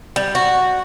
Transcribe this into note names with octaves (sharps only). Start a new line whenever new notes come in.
G3
F#4